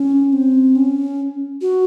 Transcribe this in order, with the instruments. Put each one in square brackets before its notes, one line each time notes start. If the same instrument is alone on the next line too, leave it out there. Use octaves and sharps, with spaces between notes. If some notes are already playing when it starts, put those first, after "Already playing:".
Already playing: [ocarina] C#4
C4
C#4
F#4